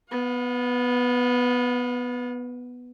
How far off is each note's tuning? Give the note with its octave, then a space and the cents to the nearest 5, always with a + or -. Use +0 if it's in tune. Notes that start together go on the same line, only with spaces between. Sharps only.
B3 +0 F5 +45